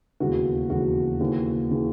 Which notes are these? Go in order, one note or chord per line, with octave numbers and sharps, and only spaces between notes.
E1 D#2 C#3 E3 F#4
E1 D#2 C#3 E3 F#4
D#2 C#3 E3
C#3 E3